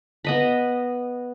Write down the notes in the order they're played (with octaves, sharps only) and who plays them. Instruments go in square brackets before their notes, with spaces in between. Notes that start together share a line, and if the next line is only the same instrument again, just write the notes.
[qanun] B3 D#5 B5